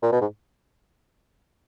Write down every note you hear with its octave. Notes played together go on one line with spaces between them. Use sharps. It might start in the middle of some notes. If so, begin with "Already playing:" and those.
A#2
B2
G#2